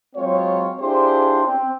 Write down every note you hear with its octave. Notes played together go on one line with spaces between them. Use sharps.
F#3 G#3 C4 F4 C#5
D4 E4 F4 G4 G#4 C5
C4